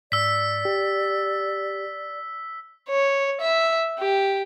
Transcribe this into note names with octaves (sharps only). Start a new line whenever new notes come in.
G#2 D5 E6 B6
G4
C#5
E5
G4